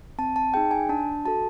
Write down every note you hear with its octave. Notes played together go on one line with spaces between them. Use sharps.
C4 A5
A5
D#4 G#4 G5
G#5
D4 A5
F#4 A4 A5